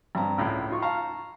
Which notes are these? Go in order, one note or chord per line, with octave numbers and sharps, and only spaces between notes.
G2 C4 A5 A#5
C#2 A2
D#4 F4 C#6
F5 A5 A#5 C#6